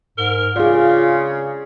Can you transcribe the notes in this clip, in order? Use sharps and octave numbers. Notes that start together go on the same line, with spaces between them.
G#2 A#4
C#3 F4 G#4 D5